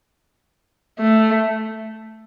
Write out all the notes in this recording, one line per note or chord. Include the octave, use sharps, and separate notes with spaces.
A3